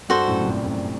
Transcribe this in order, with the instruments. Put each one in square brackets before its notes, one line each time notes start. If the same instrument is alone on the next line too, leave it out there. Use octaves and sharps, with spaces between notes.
[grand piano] G2 [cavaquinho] F#4 A4 C5
[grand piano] F#2 A2
C3
G2 A#2
F#2 A2